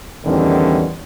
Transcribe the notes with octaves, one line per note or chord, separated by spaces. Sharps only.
E2 A2 D3 D#3 G3 C#4